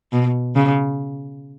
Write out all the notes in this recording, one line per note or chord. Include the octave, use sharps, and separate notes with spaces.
B2
C#3